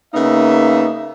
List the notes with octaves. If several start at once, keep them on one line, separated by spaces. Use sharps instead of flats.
C#3 A#3 B3 D#4 E5